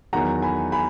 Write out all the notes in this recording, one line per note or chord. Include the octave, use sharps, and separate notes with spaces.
E2 D#3 F#3 F#5 A#5
G#5 B5
G#5 B5